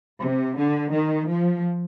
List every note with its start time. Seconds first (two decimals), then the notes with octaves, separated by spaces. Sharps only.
0.21 C3
0.57 D3
0.93 D#3
1.29 F3